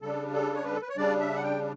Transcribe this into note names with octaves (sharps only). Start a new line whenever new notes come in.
C#3 G3 D4 A4
A4
C#5
B4
A4
B4
C#5
C#3 G3 D4 D5
E5
F#5
G5